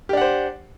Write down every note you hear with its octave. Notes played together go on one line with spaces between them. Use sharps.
D4 G4 C5 F#5